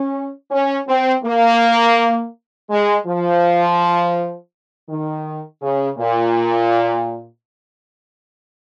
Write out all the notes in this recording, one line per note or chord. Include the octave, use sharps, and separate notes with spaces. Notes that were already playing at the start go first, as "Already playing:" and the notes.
Already playing: C#4
C#4
C4
A#3
G#3
F3
D#3
C#3
A#2